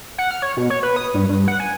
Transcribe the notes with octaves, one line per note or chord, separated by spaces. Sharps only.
F#5
F6
C#5
B2
C#5
B4
D#6
G2
G2
F#5
G#5